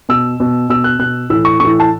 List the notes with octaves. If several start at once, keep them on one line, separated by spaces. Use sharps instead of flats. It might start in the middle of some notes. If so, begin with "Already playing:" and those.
B2 E6
B2
B2 E6
F#6
B2 F#6
A2 E3 E6
C#6
A2 E3 C#6
A5